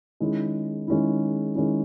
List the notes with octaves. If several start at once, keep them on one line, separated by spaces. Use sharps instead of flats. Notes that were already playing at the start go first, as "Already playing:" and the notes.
D#3 G#3 C#4 E4
D#3 G#3 C#4 E4
D#3 G#3 C#4 E4